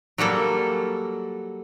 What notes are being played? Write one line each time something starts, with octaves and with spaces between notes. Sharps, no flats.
F#3 G3 A#3 A4